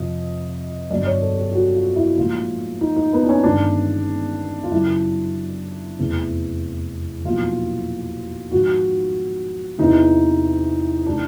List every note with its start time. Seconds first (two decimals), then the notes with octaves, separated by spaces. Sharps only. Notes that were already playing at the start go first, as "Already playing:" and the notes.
Already playing: F2 C3 F3 D#5
0.90 G1 G2 D3 F#3 D5
1.07 C#5
1.22 A4
1.37 G4
1.49 G4
1.54 F#4
1.75 F4
1.96 E4
2.17 A#1 G#2 F3 A3 F4
2.81 D#4
2.96 D#4
3.13 B3
3.24 D4
3.29 C#4
3.43 G1 G2 D#3 G#3 D4
4.63 F4
4.71 F#2 C#3 F#3 E4
5.98 F1 E2 C3
7.24 B1 A#2 F3 F4
8.51 G#1 G#2 F3 F#4
9.79 E2 C3 E3 D#4
11.06 C3 E3 G#3 D4